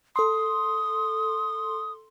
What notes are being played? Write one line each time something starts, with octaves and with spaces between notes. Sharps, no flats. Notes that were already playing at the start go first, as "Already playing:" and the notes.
A4 C6 D#6